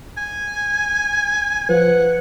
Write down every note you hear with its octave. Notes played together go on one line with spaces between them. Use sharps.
G#5
F3 B4 F#5